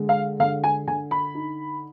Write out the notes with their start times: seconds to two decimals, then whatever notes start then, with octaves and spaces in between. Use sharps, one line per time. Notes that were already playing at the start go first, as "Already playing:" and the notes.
Already playing: D3 G#3
0.09 F5
0.39 D3 F5
0.64 G#5
0.87 D3 G#5
1.11 B5
1.35 D#4